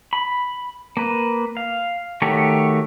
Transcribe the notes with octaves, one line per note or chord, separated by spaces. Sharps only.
B5
A#3 B4
F5
D#3 A3 F#4 G4 C#5